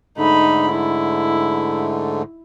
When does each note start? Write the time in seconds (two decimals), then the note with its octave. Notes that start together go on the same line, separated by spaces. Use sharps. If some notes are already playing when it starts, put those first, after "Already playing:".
0.18 G#2 D3 A3 D#4 B5
0.71 E4